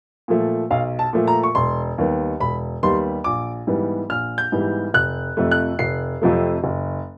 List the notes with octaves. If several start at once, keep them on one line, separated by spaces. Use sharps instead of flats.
A#2 F3 A3
B1 F5
A5
A#2 F3 A3
A#5
C#6
E1 C6
D#2 D#3 G3 B3
E1 B5
D#2 D#3 G3 B3 C6
A#1 D6
G#2 E3 G3 B3
A#1 F6
G6
G#2 E3 G3 B3
F1 F#6
F2 C3 F3 A3
F#6
F1 C7
F2 C3 F3 A3
F#1